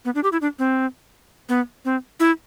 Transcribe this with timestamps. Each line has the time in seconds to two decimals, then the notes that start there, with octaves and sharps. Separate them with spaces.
0.05 B3
0.15 D4
0.23 G4
0.32 E4
0.41 D4
0.59 C4
1.49 B3
1.85 C4
2.20 E4